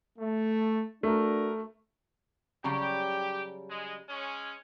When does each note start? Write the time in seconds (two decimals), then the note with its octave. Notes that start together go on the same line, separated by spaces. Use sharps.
0.19 A3
1.03 A3 D4 F#4 A#4
2.64 C#3 F#3 G3 G4
3.70 G#3
4.09 G#3 C#4